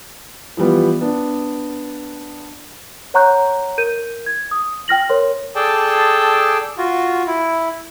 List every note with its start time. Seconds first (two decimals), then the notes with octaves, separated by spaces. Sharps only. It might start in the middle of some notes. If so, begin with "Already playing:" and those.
0.57 E3 F3 G3 B3
1.01 B3 D4
3.14 C#5 F#5 A#5 C#6 F#6 G6
3.78 A#4 G6 D#7
4.26 G#6
4.51 D#6
4.88 G5 F6 A#6 F#7
5.09 A#4 C5 C#5 C6
5.55 G#4 A4 D5 G5 A5
6.78 F4 F#4
7.27 E4